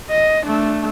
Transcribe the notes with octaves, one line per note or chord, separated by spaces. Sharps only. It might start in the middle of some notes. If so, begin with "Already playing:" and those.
D#5
A3 D4